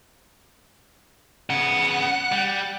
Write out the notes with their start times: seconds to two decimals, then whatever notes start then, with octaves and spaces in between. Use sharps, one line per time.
1.50 C#3 B3 F#5
2.32 G3